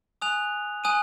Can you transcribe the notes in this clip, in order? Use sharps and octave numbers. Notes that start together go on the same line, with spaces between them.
G#5 D#6 F#6 F7
G#5 D#6 F#6 D#7